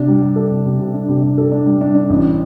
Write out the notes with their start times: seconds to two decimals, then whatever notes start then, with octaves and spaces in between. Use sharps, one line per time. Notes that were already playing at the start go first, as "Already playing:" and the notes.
Already playing: C3 D4
0.08 G3
0.22 G3
0.36 A4
0.51 C3
0.65 C3
0.80 C3
0.94 D4
1.09 C3
1.23 D4
1.38 A4
1.52 D4
1.66 G3
1.81 D4
1.95 D4
2.10 A1